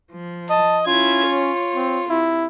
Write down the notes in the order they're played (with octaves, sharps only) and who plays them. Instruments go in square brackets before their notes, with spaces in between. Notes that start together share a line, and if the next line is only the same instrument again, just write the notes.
[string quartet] F3
[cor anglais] D#5 [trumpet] A5
[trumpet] C#4 [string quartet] E4 G#6 [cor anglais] F4
[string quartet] C#5
[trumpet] C4
[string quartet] C3 [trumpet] E4